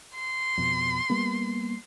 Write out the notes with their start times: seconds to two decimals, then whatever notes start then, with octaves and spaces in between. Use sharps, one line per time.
0.15 C6
0.57 F2 B2
1.10 G3 A#3 B3